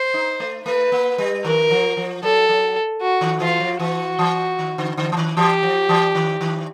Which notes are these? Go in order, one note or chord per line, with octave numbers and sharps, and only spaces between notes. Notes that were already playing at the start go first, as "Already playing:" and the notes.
Already playing: C5
D#4
A3
A3 B4
A#3
G3
D#3 A#4
F3
F3
F#3 A4
F#3
F#4
D#3
E3 F4
F3
E3 F#4
E3
D#3
D3
D3
E3
D#3
E3 G4
F3
E3
D#3
D#3